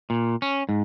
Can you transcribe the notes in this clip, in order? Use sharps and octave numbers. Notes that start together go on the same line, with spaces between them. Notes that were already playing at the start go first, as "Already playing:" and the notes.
A#2
C#4
G#2